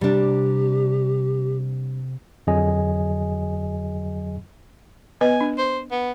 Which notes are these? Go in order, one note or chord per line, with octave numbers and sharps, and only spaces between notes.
C3 G3 D4 G4
F2 D3 F#3 G#4 D#5 G#5
B3 B4 D#5 G#5
D4
C5
B3